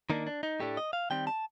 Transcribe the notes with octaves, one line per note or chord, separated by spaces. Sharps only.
D#3 A#3 D4 D#4
D4
D#4
A2 A3 D4 G4
D#5
F5
D#3 G3 C4 G5
A5